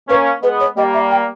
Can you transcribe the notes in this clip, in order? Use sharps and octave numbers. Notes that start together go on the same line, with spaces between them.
A#3 C#4 B4
G#3 B3 B4
C#5
G3 A#3 D#5
E5
G5